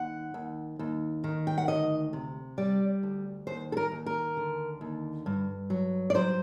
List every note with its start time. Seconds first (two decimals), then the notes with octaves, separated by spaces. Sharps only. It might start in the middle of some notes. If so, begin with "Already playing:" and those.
Already playing: D#2 F#5
0.34 D#2
0.79 D#2
1.24 D#3
1.47 G5
1.58 F#5
1.68 D2 D#5
2.13 C3
2.58 G3 D5
3.03 D2
3.47 D#2 C5
3.72 A4
3.77 A#4
3.92 D#2
4.06 A#4
4.37 D3
4.81 D#2
5.26 G2
5.70 F#3
6.10 D5
6.15 F#3 C5